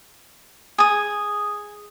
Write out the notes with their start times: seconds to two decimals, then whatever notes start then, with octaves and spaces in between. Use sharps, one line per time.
0.78 G#4 D#6